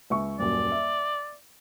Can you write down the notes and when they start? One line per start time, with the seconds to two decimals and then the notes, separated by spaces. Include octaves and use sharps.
0.10 C#2 E5 C#6
0.39 D#1 F#2 D5
0.72 E5